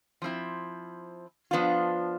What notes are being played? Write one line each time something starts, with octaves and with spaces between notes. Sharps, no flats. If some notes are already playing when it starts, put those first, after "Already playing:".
F3 C4 E4
F3 B3 D4 F4